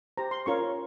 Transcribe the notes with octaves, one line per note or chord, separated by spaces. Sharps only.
G4 C5 A#5
C6
C#4 F4 A#4 C#5 C#6